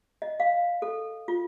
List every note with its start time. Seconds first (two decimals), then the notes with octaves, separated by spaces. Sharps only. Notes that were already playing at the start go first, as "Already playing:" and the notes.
0.22 D#5
0.40 F5
0.82 A4
1.28 F4